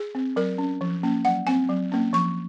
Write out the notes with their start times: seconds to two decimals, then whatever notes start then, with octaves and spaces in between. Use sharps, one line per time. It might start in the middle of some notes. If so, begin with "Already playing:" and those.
Already playing: G#4
0.15 C4
0.36 F#3 A#4
0.58 C#4
0.81 F3
1.03 A#3 C#4
1.25 F#3 F#5
1.47 C4 G#5
1.69 F#3
1.92 A#3 C#4
2.13 F3 C#6